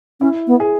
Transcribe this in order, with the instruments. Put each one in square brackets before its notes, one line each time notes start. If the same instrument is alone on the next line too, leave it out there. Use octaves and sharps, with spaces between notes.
[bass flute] C#4 [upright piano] E4
[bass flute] B3
[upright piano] G#4